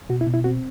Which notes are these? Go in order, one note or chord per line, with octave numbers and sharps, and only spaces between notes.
B2 F#4
E4
B2
E4
C4 F#4